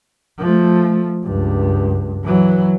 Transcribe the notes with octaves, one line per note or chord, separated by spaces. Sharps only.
F3 A3
C#2 G2
E3 F#3